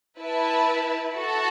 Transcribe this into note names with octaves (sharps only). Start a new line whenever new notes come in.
E4 B4 E5 A5
F#4 A4 F#5 A5